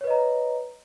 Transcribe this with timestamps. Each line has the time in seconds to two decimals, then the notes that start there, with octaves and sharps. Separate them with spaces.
0.01 C#5
0.04 B4
0.07 D#5
0.10 A#5